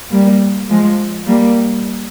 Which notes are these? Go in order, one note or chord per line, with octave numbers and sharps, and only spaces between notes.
G3 A#3
F3 G#3
G3 A#3